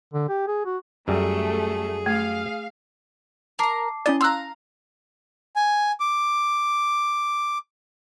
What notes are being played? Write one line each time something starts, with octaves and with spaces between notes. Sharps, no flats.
D3
G4
G#4
F#4
F#2 G3 A3 G#4
A3 F5
A#4 A5 A#5 D6 C7
C#4 E4 D5 D#5
F5 A#5 C6 E6 F#6
G#5
D6